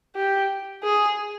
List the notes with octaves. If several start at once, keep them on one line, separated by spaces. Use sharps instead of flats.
G4
G#4